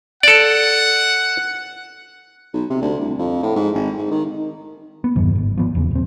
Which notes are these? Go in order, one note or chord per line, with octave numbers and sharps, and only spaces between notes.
A4 D5 F#5
B1
C3
D2
C2
F2
A2
G#2
G#1
G#2
D#3
B3
E2 G2 D#3 F#3
G#1
F3 B3
E1 E2 C#3
D#1 C4